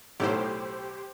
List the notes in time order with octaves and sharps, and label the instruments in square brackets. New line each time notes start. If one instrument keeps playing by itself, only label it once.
[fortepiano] B1 A2 [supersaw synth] G4 C5